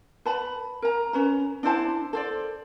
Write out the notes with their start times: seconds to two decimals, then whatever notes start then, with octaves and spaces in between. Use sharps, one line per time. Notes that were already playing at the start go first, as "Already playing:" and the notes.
0.25 B4 A5 B5
0.82 A#4 A#5
1.13 C#4 B4 A#5
1.63 D4 E4 C5 A5
2.13 A4 C5 D5